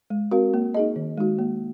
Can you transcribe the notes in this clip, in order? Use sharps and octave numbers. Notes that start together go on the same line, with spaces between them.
G#3
C4 F#4 A#4 F5
A#3
D#4 G#4 D#5
D#3
G#3 D#4 F#4
A#3